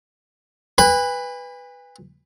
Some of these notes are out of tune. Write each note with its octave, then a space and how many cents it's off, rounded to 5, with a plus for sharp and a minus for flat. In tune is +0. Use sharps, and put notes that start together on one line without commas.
B4 +0 G#5 -40 B5 +15